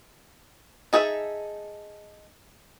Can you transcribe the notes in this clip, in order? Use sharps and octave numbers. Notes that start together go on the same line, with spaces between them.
D#4 G#4 A4 C5 E5